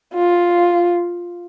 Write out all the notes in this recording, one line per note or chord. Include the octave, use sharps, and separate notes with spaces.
F4